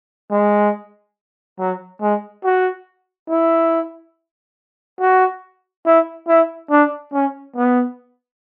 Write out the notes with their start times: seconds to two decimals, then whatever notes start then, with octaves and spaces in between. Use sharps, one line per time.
0.31 G#3
1.59 F#3
2.01 G#3
2.44 F#4
3.29 E4
5.00 F#4
5.86 E4
6.28 E4
6.70 D4
7.13 C#4
7.56 B3